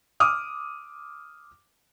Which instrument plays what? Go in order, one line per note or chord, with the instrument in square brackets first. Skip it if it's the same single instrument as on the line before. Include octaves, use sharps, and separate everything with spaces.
[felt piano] D6 D#6 F6